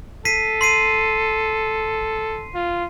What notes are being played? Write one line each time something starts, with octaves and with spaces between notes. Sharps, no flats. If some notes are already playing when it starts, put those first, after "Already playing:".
A4 B6 C7 D#7
C6 C7 D#7
F4